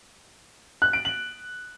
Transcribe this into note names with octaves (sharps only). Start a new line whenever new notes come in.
F#6
D7
F#7